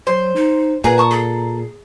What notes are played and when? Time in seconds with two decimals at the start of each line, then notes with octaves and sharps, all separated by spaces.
0.07 F#3 C5 C6
0.36 D#4
0.84 A#2 G#4 B4 F#5 A#5
0.98 A5 C#6 D#6
1.11 G#4 A4